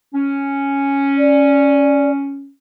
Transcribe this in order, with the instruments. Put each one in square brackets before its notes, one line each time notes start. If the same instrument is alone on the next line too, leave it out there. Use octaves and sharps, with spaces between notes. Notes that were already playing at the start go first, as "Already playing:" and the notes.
[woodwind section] C#4
[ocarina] D5